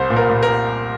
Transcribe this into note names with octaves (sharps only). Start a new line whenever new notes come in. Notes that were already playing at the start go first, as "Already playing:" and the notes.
Already playing: C2 C5
A#2
A#4
A#2
A#4